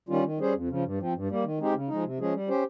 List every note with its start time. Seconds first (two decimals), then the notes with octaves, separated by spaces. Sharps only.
0.09 D#3 G3 C#4 F4
0.24 D#3
0.38 G3 C#4 G#4 C5
0.54 F2
0.69 C#3 F3
0.84 G2
0.98 F3 C4
1.13 G2
1.29 G3 A#3
1.44 D#3
1.59 G#3 C4 D#4 G4
1.74 C#3
1.88 F3 G#3 D#4
2.04 C3
2.18 F3 G#3 C#4 G#4
2.34 G3
2.48 C#4 G4 C5